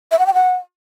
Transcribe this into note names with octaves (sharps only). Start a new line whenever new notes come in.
E5
F#5
G5
F#5